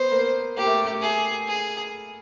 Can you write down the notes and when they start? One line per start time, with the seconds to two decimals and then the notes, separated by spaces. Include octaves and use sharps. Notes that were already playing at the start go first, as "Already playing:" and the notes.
Already playing: B3 C5
0.11 A#3
0.57 A#3 G4
0.66 A3
0.85 A3
1.02 G#4
1.47 G#4